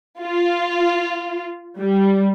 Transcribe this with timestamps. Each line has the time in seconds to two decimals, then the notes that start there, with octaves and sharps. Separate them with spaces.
0.22 F4
1.79 G3